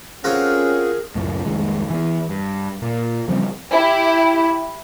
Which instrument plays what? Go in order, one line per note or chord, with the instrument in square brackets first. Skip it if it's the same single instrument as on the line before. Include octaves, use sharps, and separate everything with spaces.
[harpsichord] C4 F4 F#4 [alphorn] C#4 [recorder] G#4 [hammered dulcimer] A#4 F5
[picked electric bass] C#2 F#2 A2
C2 F2 D#3 G#3
E3 B3
G2
A#2
C#3 F3 G3 C4
[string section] E4 G4